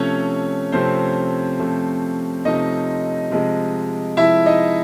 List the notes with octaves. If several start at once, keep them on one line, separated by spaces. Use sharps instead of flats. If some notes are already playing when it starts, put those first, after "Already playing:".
Already playing: C3 F3 A3 C#4 C#5
C3 F3 A3 C4 C5
C3 F3 A3
C3 F3 A3 D#4 D#5
C3 F3 G#3
C3 F3 G#3 E4 E5
D#4 D#5